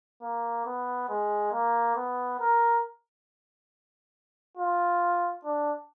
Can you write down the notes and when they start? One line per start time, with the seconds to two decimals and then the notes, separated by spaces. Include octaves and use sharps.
0.22 A#3
0.66 B3
1.09 G#3
1.52 A#3
1.96 B3
2.40 A#4
4.57 F4
5.45 D4